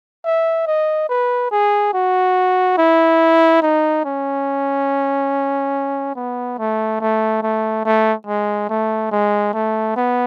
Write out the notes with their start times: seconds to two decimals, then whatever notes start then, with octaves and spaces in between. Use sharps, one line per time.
0.25 E5
0.67 D#5
1.09 B4
1.51 G#4
1.93 F#4
2.77 E4
3.62 D#4
4.05 C#4
6.16 B3
6.59 A3
7.00 A3
7.43 A3
7.85 A3
8.27 G#3
8.69 A3
9.11 G#3
9.54 A3
9.96 B3